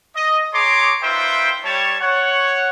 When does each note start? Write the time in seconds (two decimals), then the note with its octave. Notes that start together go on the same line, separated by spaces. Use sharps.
0.16 D#5
0.54 G#4 C#5 A#5 C6 D6
1.03 D#4 F4 B4 C5 E5 G5
1.64 G3 C#5 A5
2.00 C#5 F#5